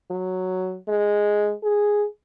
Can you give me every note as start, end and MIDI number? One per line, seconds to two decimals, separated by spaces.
0.11 0.77 54
0.88 1.53 56
1.63 2.05 68